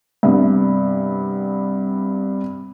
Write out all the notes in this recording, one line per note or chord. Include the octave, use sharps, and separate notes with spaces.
G2 C3 B3